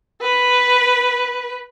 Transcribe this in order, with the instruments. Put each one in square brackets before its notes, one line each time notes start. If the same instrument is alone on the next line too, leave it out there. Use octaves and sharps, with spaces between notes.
[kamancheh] B4